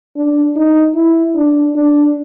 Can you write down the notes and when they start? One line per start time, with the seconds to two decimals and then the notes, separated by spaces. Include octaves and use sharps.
0.17 D4
0.56 D#4
0.95 E4
1.36 D4
1.76 D4